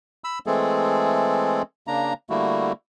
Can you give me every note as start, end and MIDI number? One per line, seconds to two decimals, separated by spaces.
0.24 0.39 83
0.24 0.39 88
0.47 1.62 52
0.47 1.62 56
0.47 1.62 57
0.47 1.62 60
0.47 1.62 68
0.47 1.62 69
1.87 2.13 49
1.87 2.13 58
1.87 2.13 62
1.87 2.13 82
2.30 2.72 50
2.30 2.72 55
2.30 2.72 57
2.30 2.72 58
2.30 2.72 64
2.30 2.72 66